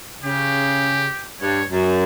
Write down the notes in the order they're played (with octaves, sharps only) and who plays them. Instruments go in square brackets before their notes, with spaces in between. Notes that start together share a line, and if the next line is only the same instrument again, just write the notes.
[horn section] C#3 [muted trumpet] G4
[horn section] G2 [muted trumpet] C#5
[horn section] F#2